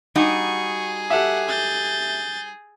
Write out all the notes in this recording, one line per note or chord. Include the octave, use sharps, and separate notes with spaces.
G3 D#4 F#4 G#4 C#6
G4 A4 E5 F#5
G6 A6